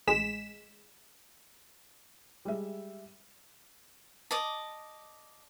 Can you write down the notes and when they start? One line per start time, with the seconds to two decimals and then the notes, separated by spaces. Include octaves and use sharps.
0.07 A1 G#3 B6 E7
2.45 G3 G#3 E5
4.31 D5 D#5 A5